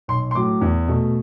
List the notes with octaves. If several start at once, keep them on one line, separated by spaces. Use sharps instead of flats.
B1 C6
C6
A2 F#3 D6
E2
B2 A3